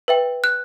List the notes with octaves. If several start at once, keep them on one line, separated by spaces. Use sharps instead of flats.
B4 E5 G5
F#6